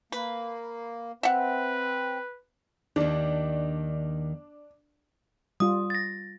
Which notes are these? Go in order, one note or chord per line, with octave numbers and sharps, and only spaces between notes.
A#3 B4
C4 B4 E5 F#5
D#2 D#3 D4
G3 F4 D#6
A6 A#6